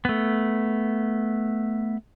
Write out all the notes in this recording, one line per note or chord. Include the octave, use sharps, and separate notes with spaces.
A3 B3